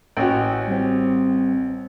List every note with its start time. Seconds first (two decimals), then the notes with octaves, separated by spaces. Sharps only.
0.17 A1 C#4 F#4 G5
0.68 G3 C4